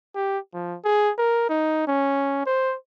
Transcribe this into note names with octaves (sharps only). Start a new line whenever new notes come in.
G4
F3
G#4
A#4
D#4
C#4
C5